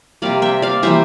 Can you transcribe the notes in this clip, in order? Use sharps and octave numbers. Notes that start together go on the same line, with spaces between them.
C3 G3 A#3 D5 F5
E5 G5
D5 F5
E3 G3 A#3 C5 E5